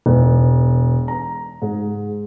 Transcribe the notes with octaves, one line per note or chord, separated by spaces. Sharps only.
E1
A#5
G#2